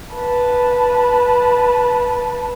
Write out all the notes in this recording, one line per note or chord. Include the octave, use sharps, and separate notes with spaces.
B4 A5